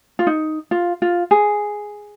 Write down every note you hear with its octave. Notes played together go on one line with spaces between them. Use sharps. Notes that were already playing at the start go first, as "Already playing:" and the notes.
F4
D#4
F4
F4
G#4